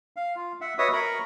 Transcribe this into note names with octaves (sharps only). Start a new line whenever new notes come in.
F5
F4
E5 F#5
F#4 B4 C#5 D#5 E5 D#6
A#4 A#5 B5 C#6